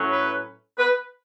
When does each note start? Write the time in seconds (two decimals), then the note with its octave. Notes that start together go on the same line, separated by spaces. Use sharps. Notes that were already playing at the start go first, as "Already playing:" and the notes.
Already playing: A2 F#3 C#4
0.11 B4
0.79 B4